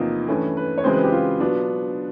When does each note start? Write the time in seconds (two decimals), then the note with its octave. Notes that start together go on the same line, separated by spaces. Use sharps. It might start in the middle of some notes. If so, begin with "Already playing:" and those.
Already playing: E2 C3 F3 A#3 D#4
0.28 G2 E3 A3 C#4
0.57 B4
0.78 C#5
0.84 F#2 C#3 E3 G#3 C4 C5
0.93 B4
1.03 G4
1.12 F4
1.40 B2 F#3 B3 D4 F4